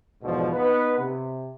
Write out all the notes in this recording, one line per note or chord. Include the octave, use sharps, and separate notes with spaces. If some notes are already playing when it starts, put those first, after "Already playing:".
E2 G#2 B2 D3 F3
B3 D#4 B4
C3